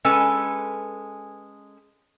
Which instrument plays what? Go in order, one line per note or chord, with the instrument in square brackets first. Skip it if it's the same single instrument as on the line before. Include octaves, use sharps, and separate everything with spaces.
[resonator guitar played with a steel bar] G#3 C#4 A4 B4 G#5